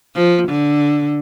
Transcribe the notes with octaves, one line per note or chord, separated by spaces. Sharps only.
F3
D3